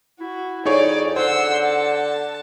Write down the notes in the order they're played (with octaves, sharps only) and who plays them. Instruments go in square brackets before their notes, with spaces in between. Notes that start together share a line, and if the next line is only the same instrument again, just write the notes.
[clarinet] E4 [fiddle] F#4
[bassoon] F2 [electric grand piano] D#4 G#4 C#5 [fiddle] D5
[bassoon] D3 [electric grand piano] C5 [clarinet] F#5 [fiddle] C6 E6
[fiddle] A5